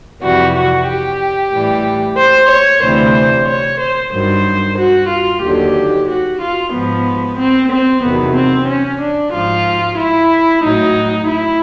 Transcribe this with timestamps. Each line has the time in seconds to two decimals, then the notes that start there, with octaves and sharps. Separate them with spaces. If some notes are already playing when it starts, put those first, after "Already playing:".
0.22 F2 C3 E3 G3 F#4
0.55 F#4
0.88 G4
1.52 A2 E3 G3
2.18 C5
2.49 C#5
2.82 D2 C3 E3 G3 C5
3.47 C#5
3.80 C5
4.12 G2 D#3 F#3 C5
4.77 F#4
5.09 F4
5.42 D#2 D3 F#3 G4
6.07 F#4
6.40 F4
6.72 G#2 F3 B3
7.38 C4
7.70 C4
8.02 E2 C3 D#3 F#3 B3
8.35 C4
8.67 C#4
8.99 D4
9.32 G#2 F3 F4
9.97 E4
10.63 A2 F#3 D#4
11.28 E4